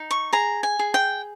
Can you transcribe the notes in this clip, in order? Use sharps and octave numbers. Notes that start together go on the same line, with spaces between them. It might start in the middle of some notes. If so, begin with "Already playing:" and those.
Already playing: D#4
C#6
G#4 A#5
G#5
G#4
G5